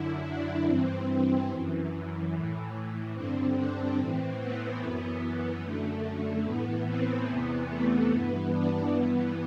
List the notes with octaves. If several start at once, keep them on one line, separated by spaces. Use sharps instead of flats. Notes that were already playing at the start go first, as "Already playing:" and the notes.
Already playing: F#2 D3 E4
D4
G2 E3 C4
F#2 E3
A2 E3
G2 D3 C4
D4
A2 E3 C4
B3
F#2 E3 B3
B3
F#2 D3 A3
A2 E3 B3
C4
E2 C3 E3 B3
A3
G2 E3 B3
D4
G2 E3 B3